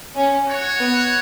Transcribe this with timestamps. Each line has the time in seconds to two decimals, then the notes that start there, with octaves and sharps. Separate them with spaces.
0.15 C#4
0.47 F#4 C#5 F#5
0.80 B3